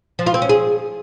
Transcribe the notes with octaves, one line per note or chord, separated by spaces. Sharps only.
F3
F4
C4
C#4
G#4